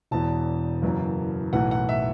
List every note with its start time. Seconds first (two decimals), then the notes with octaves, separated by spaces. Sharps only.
0.11 E1 E2 E3 A5
0.82 F#1 F#2 E3
1.53 B1 A2 E3 F#5
1.71 F#5
1.89 E5